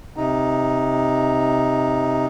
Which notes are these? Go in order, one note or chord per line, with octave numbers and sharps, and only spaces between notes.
C3 D#4